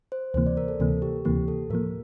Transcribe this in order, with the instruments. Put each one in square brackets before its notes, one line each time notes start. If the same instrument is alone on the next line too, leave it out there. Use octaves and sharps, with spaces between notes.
[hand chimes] C5
[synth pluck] D2 C3 E3 A#3 [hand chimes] C5
[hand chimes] D5
A#4
A4
[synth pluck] D2 C3 E3 A#3 [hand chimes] A4
[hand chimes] G4
[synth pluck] D2 C3 E3 A#3 [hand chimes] G4
[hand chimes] A4
[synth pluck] A2 [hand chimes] A#4
[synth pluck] F3 A#3